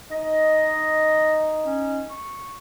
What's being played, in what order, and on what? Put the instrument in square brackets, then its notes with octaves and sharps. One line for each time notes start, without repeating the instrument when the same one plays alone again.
[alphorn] D#4 [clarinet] D#5
[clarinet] C#4
C#6